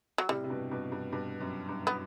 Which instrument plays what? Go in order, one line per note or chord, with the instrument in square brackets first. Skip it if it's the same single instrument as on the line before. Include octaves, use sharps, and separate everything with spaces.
[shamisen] F#3
[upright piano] A2 C3 [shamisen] G3
[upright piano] C3
G2 B2
G2 B2
G2
G2 B2
F#2
G2
[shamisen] B3